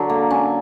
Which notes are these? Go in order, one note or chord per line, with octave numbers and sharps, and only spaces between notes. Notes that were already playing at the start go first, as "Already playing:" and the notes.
Already playing: D3 F#3
A#3
C#4